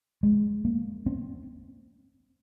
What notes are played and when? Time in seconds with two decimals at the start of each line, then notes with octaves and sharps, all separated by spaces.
0.23 G#3
0.65 A#3
1.06 C4